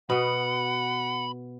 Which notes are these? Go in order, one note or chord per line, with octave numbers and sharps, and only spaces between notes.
B2 B3 F#5 B5